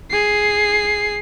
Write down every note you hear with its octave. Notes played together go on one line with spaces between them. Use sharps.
G#4 C7